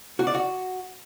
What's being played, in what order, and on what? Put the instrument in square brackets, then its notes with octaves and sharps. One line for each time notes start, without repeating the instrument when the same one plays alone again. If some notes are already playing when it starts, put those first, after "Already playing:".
[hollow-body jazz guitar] F#4
D5
F#4